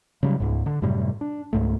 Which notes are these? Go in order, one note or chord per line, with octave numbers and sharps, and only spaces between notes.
C#3 F#3 G3
C#2 G#2
D3
F#2 A2 C3 G3
D4
C#2 G#2 A3